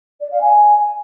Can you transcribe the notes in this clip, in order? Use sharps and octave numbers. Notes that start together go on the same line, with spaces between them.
D5
F5
G#5